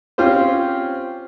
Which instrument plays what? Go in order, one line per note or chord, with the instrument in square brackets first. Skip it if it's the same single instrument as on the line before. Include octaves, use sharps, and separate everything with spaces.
[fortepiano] C4 C#4 F4 G4 C5